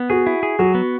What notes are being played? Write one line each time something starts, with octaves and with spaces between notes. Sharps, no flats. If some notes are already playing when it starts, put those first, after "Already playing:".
Already playing: B3
F#4 G#4
E4
G#4
F#3 F#4
B3